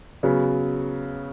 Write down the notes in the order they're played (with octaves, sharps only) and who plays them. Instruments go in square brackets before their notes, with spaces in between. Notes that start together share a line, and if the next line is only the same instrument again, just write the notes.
[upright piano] C#3 F#3 B3